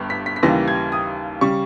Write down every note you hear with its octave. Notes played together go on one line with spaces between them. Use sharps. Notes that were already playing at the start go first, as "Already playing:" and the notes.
Already playing: G1 G2 G3
B6
B6
B6
D#2 C#3 E3 G3 A#3 A#6
G#6
D#6
C#3 G3 C#6